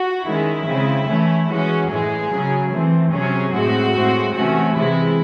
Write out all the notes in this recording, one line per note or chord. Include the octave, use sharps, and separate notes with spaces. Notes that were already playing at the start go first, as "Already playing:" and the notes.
Already playing: F#4
D#3 G#3 C#4 E4
C#3 G#3 C4
E3 A3 C#4
E3 G#3 C#4 F#4
A2 E3 G#3 G#4
C#3 F#3 C#4
E3 A3 C4
C3 F#3 C#4 G#4
A2 G#3 C4 F#4
A2 G#3 C4
C3 E3 A3 C#4 F#4
C3 E3 G#3 E4